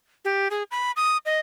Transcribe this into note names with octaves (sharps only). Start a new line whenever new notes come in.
G4
G#4
B5
D#6
D#5